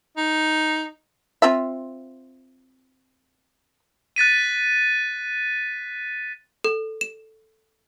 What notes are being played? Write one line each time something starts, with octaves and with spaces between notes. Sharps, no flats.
D#4
C4 F4 E5
F#6 A6 B6 D#7
A4
E7